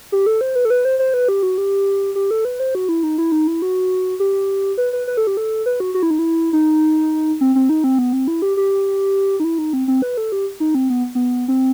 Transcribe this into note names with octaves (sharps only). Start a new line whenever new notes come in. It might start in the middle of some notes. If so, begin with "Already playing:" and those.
G4
A4
C5
B4
A4
B4
C5
C5
B4
G4
F#4
G4
G4
A4
B4
C5
F#4
E4
D#4
E4
D#4
E4
F#4
G4
B4
B4
B4
A4
G4
A4
B4
F#4
F#4
E4
D#4
E4
D#4
C4
C4
D#4
C4
B3
C4
E4
G4
G4
D#4
E4
D#4
C4
C4
B4
A4
G4
D#4
C4
B3
B3
C4